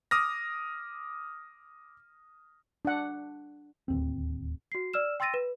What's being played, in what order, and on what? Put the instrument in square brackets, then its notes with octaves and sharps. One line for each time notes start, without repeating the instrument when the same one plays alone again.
[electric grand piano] D6 D#6 F6 A#6
[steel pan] D4 F#5
[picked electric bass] D1 D#2 C4
[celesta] F#4 C7
D5 E6 F6 E7
G5 C6 E6 A6 A#6 D#7
B4